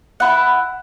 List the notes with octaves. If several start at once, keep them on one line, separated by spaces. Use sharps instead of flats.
E4 F#5